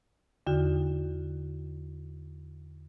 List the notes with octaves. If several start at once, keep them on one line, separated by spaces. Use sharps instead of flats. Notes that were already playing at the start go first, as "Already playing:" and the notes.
E2 D3 D#4 F#4